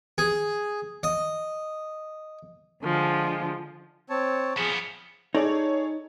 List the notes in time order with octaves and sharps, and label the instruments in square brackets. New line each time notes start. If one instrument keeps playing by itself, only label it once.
[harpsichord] G#4
D#5
[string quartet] D3 F3 G#3
[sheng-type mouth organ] C4 C#5 A5
[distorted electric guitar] F3 B3 [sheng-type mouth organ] G#4
[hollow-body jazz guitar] D#4 D5 [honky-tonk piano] G#4 A4 C#5